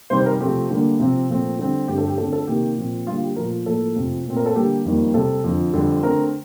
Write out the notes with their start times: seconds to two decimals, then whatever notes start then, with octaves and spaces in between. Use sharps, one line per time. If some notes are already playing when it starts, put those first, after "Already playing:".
0.10 C3 D#3 G3 C5
0.26 A#4
0.40 C3 F3 A3 C4 G4
0.70 D3 G3 A#3
1.00 C3 F3 C4
1.29 A#2 F3 A3 C4
1.59 D3 G3 C4
1.88 G2 D3 A3 C4 G4
1.98 A4
2.08 G4
2.18 D3 A3 C4 A4
2.33 A4
2.48 C3 D#3 A#3 G4
2.77 A#2 F3 C4
3.06 D3 G3 A#3 F4
3.22 G4
3.36 A#2 F3 A3 A#4
3.66 A2 F3 A#3 A4
3.95 F2 C3 F3 A3 C4
4.26 A#2 A3 C4
4.37 A#4
4.46 A4
4.55 D3 G3 A#3 G4
4.85 F2 D#3 G3 A#3
5.14 C3 G3 C4 A4
5.44 F2 D3 F3
5.74 F2 D3 G3 C4
6.03 D3 A3 C4 A#4